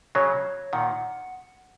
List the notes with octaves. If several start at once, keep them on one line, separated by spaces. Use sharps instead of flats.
C#3 F#3 C#5
A#2 D#3 F#5